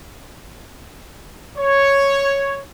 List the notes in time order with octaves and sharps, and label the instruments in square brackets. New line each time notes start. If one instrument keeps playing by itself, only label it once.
[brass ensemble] C#5